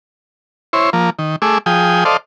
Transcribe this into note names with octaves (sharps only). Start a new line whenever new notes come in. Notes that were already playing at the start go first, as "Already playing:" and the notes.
E4 C5 C#5
F3 A#3
D#3
A3 G#4 D6 E6
F3 G#4 G5 D#6
A4 C5 D5 D#5 F5